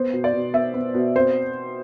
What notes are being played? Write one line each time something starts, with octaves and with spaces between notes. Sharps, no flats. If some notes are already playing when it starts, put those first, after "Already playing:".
Already playing: B3 C5
B2
D5
B2
B3 E5
B3
B2
C4 C5